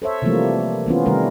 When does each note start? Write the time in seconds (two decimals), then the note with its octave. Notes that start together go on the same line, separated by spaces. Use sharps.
0.02 A4 C5 C#5 E5
0.22 C3 E3 F3 G3 A3 A#3
0.86 E3 B3 C#4 F4
1.06 C3 D#3 G3 A3 A#4